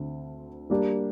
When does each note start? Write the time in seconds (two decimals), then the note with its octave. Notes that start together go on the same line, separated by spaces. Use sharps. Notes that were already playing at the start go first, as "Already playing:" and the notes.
Already playing: D2 D3 C4
0.70 G3 A#3 D4 G4